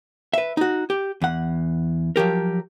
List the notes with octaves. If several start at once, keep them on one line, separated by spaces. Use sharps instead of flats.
B4 E5
D#4 F#4
G4
E2 F#5
F3 F#3 G4 A#4